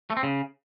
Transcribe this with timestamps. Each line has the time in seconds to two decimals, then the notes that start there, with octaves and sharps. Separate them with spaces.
0.10 A3
0.17 C4
0.23 C#3